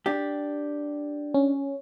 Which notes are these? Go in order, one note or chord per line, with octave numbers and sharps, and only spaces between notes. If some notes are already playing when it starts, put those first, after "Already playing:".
D4 G4
C#4